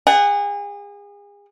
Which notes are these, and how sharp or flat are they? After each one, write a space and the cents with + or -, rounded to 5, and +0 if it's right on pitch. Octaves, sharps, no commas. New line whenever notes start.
G#4 -35 F#5 +10